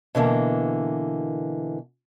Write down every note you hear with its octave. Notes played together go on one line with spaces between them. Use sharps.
B2 D3 E3 A#3